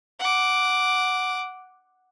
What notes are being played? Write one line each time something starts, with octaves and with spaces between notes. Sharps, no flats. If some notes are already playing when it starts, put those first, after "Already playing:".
F#5 D6